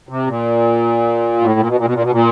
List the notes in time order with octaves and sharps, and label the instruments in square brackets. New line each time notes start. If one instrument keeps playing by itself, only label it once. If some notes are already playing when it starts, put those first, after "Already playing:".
[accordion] C3
A#2
A2
A#2
B2
A#2
B2
A#2
B2
A#2